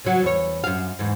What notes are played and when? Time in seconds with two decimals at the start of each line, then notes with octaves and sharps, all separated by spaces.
0.05 C#3 F#3
0.22 E2 C#5
0.64 F#2 F5
0.99 E2 G#2